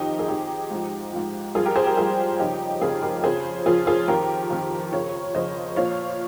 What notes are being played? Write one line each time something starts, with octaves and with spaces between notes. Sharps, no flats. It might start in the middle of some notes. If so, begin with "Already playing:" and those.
Already playing: F2 D#3 D#4 G4
G#4
F2 D#3 D#4 G4
G#2 F3
G#2 F3
G2 F3 F4 G#4
G4 A#4
G#4 C5
G4 A#4
G2 F3 F4 G#4
F2 C#3 F3 D#4 G4
F2 C#3 F3 F4 G#4
G4 A#4
F2 C#3 F3 G#4 C5
F2 C#3 F3 F4 G#4
F4 G#4
F2 D#3 G4 A#4
F2 D#3
F2 C#3 F3 A#4 C#5
F2 C#3 F3 C5 D#5
A#2 F3 C#5 F5